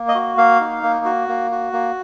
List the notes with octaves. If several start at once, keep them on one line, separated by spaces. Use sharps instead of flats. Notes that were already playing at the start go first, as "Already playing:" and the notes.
Already playing: A#3
D#5
F#4
A#3 F5
D#4
A#3
F#4
A#3
F#4
A#3